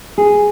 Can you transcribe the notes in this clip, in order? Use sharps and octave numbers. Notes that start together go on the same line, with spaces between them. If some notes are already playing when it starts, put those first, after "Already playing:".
G#4